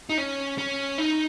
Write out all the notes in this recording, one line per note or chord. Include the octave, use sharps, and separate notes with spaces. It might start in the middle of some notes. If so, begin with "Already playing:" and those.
D#4
C#4
C#4
D#4